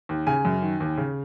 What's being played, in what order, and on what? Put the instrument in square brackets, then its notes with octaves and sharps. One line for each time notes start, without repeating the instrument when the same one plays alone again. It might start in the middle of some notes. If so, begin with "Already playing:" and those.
[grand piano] D#2
C#3 G#5
F#2
D#3
D#2
C#3